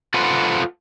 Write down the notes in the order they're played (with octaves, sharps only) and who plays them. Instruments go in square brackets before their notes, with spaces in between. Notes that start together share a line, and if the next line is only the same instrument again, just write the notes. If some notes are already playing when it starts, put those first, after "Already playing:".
[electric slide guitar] F4 A4 B4 C5 F#5